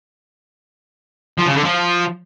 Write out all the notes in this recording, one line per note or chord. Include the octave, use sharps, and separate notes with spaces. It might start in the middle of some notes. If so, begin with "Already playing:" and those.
F3
C#3
D3
F3